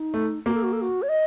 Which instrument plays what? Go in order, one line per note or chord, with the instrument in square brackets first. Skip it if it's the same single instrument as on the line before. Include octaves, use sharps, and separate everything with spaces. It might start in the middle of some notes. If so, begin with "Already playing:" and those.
Already playing: [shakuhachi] D#4
[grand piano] A3
[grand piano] A#3 [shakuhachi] F#4
[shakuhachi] A4
F#4
A4
F#4
C#5
D#5